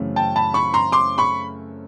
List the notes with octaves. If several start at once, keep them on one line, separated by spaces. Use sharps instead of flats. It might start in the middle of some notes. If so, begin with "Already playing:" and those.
Already playing: F#2 C#3 E3 A3 C4
G5 A5
A5 B5
B5 C#6
A#5 C6
C6 D6
B5 C#6